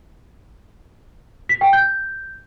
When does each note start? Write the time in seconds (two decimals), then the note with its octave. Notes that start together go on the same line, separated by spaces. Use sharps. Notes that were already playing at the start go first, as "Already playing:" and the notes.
1.49 B6
1.61 G5
1.73 G6